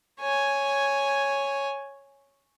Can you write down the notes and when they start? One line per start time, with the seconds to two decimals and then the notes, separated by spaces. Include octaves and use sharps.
0.20 C#5 G#5